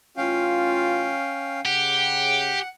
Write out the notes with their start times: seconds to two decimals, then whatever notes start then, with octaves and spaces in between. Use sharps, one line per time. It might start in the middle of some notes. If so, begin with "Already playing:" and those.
0.17 A1 C#4 F4 F5 G5
1.65 C#3 G4 F#5